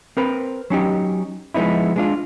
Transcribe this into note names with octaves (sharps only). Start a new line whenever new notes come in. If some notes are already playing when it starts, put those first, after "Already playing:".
C4 A#4 B4
F#3 C#4 D#4 G4
F3 G#3 B3 D#4 E4
G#3 D4 F4